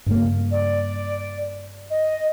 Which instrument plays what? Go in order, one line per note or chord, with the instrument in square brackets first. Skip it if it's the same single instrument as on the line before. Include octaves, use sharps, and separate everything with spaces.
[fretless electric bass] G2 C#3 A#3
[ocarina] D5
D#5